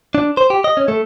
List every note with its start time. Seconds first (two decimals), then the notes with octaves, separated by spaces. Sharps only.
0.15 D4
0.37 C5
0.50 G4
0.64 D#5
0.77 C#4
0.88 A3